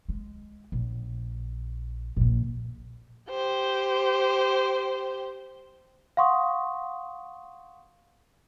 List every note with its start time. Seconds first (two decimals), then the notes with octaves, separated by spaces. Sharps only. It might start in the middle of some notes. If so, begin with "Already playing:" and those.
0.09 G#3
0.72 A#1
2.16 A#1 A#2
3.30 G4 C5
6.17 F5 F#5 C6 C#6 D#6